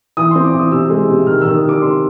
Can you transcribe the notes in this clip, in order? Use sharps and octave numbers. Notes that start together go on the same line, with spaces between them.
E3 D#6
C4 C6
D6
E3 D#6
C3 E6
G#3
C3
D#3 F6
D#3 E6
D#6
C3
D6
C3 C6